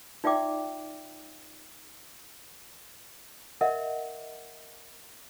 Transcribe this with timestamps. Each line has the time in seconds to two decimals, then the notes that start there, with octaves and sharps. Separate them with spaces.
0.24 D#4 F4 D5 E5 G5 D6
3.61 A#4 D#5 E5 F#5